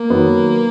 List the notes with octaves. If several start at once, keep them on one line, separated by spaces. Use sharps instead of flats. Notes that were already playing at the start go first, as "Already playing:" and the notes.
Already playing: A#3
D#3 F#3 B3